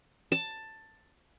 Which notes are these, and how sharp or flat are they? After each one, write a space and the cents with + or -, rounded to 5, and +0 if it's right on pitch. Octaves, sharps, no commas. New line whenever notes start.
A5 +10